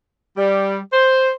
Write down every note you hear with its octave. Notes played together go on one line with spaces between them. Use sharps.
G3
C5